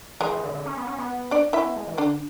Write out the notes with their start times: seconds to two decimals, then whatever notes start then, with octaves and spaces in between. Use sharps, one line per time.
0.20 E3 G#3 G#4
0.32 E3
0.43 D3
0.54 D3
0.66 C#4
0.77 B3
0.87 C#4
0.98 B3
1.31 D4 D5
1.53 C#4 E4 E5
1.65 B3
1.76 G#3
1.87 E3
1.98 D3 D4 D5